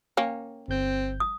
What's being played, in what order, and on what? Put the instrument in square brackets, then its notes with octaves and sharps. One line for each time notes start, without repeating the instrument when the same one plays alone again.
[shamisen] A#3 C#4 [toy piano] G5
[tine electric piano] G1 G6 [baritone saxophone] C4
[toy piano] D#6